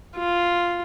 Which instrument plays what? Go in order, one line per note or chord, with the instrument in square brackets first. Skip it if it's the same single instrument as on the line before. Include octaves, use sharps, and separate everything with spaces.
[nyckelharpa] F4